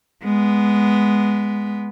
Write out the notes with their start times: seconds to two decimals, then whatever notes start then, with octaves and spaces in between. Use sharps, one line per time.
0.24 G#3 B3